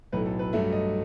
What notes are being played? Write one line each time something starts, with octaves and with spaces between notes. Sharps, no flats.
B1 A2 F#3 A3 B4
A4
B4
G2 F#3 A3 E5
D#5